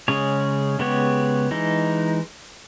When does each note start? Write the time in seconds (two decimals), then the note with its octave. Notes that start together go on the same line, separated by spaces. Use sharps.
0.08 C#3 G#3 C#4 G#4 C#5
0.79 C#3 G#3 B3 G4 C#5
1.51 E3 G#3 D#4